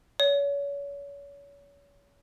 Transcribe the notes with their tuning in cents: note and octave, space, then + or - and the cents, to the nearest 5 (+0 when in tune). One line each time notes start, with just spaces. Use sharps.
C#5 +35